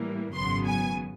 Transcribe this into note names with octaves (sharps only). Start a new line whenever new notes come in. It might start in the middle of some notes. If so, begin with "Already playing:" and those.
Already playing: A2 E3 G3 A#3
G#1 F#2 C#3 F#3 B3 C6
G#5